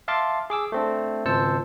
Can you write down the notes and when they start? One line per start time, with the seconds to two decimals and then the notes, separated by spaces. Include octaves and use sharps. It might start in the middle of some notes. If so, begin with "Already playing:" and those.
0.08 E5 F5 A5 C6 D6
0.50 G#4 D6 E6
0.72 A3 C4 D4
1.26 G#1 C#2 C5 A5 E6 C#7